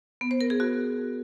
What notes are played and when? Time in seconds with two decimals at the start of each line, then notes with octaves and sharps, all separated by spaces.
0.21 B3
0.31 C5
0.41 A#4
0.50 G#4
0.60 F#4